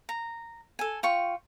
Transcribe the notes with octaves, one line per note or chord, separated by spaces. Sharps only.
A#5
A4 G#5
F4 G5 C#6